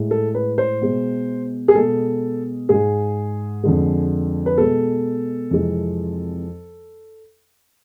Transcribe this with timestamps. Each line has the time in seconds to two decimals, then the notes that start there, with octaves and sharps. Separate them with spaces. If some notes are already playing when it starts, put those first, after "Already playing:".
Already playing: A2 G#3
0.11 A4
0.35 B4
0.58 C5
0.81 B2 G#3
1.68 G#4
1.75 B2 G#3 A4
2.69 G#2 G#3 G#4
3.63 F2 D3 G#3
4.46 B4
4.58 B2 G#3 A4
5.51 F2 C3 E3 G#3